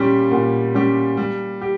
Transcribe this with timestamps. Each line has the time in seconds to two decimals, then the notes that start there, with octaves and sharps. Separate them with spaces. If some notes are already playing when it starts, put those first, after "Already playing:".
Already playing: A#2 G3 C#4 G4
0.31 A#2
0.74 G3 C#4 G4
1.17 G3
1.61 G4